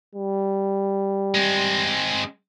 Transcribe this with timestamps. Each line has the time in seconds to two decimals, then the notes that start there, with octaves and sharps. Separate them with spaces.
0.15 G3
1.35 G#3 C4